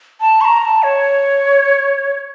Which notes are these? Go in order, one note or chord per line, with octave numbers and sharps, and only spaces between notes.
A5
C#6
A#5
A#5
A5
C#5